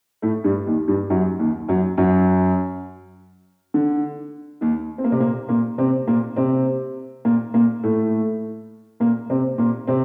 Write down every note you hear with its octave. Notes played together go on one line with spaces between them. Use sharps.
A2 A3
G2 G3
D#2 D#3
G2 G3
F#2 F#3
D#2 D#3
F#2 F#3
F#2 F#3
D3
D#2 D#3
C4
A#3
C3 C4
A#2 A#3
A#2 A#3
C3 C4
A#2 A#3
C3 C4
A#2 A#3
A#2 A#3
A2 A3
A#2 A#3
C3 C4
A#2 A#3
C3 C4